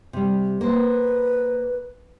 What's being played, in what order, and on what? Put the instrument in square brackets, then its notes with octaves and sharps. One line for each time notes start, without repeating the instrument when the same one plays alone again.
[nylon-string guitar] C3 G3
[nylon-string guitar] A#3 C5 [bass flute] B4